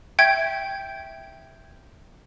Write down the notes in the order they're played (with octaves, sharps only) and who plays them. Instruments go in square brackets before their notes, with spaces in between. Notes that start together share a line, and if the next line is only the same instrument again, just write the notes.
[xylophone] E5 G5 G6 G#6 D7